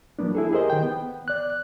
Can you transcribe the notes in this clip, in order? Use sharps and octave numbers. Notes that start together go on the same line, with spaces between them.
F3 F#3 A#3 B3 D4
E4 G#4 A4
G4 G#4 A#4 C5 D#5
D#3 G5
B3
D5 F#6